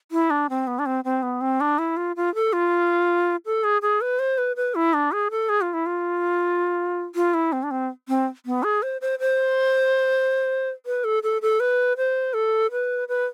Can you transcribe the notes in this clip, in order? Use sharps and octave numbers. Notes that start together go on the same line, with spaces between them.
E4
D4
C4
B3
D4
C4
C4
B3
C4
D4
E4
F4
F4
A4
F4
A4
G#4
G#4
B4
C5
B4
B4
E4
D4
G#4
A4
G#4
F4
E4
F4
F4
E4
C4
D4
C4
C4
B3
G#4
C5
C5
C5
B4
A4
A4
A4
B4
C5
A4
B4
B4